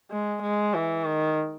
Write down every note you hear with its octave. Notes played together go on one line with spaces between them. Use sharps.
G#3
G#3
E3
D#3